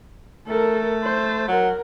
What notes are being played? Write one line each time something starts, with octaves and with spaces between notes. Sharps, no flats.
A3 A4 A#4
C5
F#3 A#4